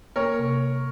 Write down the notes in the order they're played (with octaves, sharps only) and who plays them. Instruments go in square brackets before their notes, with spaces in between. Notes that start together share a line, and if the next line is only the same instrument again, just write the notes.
[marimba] A#3 [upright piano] A#4 C#5
[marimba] C3